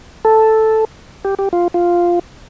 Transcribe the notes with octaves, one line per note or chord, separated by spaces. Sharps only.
A4
G4
G4
F4
F4